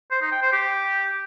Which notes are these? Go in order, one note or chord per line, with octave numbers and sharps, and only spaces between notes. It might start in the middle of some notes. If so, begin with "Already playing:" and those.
C5
D#4
G5
C5
G4